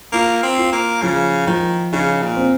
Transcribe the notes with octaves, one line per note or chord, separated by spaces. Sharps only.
A#3 F4
C4
F4
A#3
C#3 F3
D#3 F3
C#3 D#4
A#2
C4